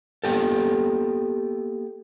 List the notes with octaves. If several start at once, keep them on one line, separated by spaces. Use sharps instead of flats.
A#3 B3 G4 A4